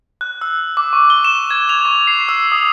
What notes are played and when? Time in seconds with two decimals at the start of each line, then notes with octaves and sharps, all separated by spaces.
0.21 F#6
0.41 E6
0.77 D6
0.93 C#6
1.10 G7
1.24 E7
1.51 G#6
1.69 F7
1.85 C#6
2.07 C7
2.29 E6
2.52 D#6